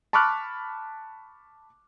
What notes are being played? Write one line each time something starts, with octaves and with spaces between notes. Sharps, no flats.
A5 B5 C#6 D6 F6 F#6